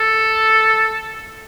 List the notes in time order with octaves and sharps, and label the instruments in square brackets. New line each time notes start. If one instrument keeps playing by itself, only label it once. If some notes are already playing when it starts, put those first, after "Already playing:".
Already playing: [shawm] A4